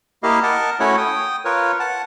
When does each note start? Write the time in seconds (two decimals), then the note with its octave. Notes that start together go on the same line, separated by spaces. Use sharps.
0.23 A#3 E4 G4 D#5 F5
0.43 A#4 D#5 F#5 A5
0.80 A3 C#4 E4 F#4 C#5 F#5
0.97 G5 D#6
1.45 F4 A#4 B4 C#5
1.80 F#5 A5